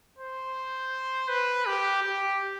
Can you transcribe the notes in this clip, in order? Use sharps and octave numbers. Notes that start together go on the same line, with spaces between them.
C5
B4
G4
G4